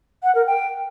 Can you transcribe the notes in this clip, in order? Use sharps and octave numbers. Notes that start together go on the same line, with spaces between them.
F#5
A#4
G5